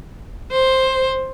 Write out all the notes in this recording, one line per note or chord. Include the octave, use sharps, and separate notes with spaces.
C5